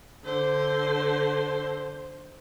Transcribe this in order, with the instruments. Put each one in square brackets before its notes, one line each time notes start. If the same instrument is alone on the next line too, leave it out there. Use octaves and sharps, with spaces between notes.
[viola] D3 C5